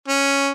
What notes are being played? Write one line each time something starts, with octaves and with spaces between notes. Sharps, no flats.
C#4